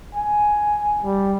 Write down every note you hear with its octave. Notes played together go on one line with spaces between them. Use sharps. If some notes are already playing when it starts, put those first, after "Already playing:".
G#5
G3